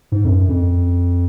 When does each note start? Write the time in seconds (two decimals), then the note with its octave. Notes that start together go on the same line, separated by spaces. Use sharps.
0.12 G#2
0.25 F2
0.31 F#2
0.49 F2